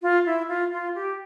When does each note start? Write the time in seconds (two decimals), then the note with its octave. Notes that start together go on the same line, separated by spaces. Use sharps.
0.02 F4
0.26 E4
0.48 F4
0.72 F4
0.95 G4